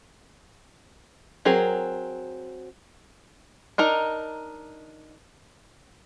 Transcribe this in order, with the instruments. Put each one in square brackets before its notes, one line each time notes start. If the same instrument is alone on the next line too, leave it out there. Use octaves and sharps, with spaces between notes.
[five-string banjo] F#3 C4 G#4 A#4
D4 D#4 A#4